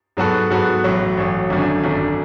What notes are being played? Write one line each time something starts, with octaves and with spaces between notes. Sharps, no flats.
G#2 F#3 B3 F#4 A4
G#2 F#3 B3 F#4 A4
A1 A2 F#3
A1 A2 F#3
G#1 F#2 D3
G#1 F#2 D3